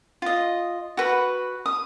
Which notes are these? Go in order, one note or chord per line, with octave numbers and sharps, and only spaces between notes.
F4 D#5
F#4 B4
D#6